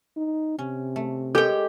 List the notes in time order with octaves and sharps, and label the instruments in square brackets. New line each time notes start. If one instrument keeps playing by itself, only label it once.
[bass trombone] D#4
[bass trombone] C3 [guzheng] C#4
[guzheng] A3
[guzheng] G#3 C#5 [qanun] G4 G5 [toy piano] A4 A#4